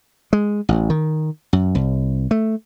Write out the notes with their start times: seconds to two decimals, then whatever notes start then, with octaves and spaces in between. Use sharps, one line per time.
0.33 G#3
0.69 A1
0.90 D#3
1.53 F#2
1.75 C2
2.31 A3